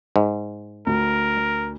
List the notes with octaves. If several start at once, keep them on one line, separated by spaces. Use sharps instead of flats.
G#2
D2 A#4